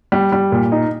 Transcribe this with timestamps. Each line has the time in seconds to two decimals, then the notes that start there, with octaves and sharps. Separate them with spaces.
0.12 G3
0.32 G3
0.52 A#2
0.72 D#4